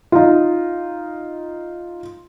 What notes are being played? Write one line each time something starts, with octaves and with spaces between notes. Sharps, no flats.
D#4 F4